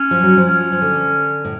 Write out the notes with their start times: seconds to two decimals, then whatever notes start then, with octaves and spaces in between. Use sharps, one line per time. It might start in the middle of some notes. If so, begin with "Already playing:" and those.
Already playing: C#4
0.11 F3
0.24 F#3
0.37 F3
0.46 C#4
0.72 F3
0.82 D3
1.45 A2